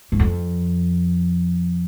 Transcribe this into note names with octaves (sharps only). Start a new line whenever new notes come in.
G#2
F2